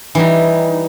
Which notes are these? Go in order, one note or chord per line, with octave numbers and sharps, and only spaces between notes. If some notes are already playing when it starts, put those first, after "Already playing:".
E3 G3 D#4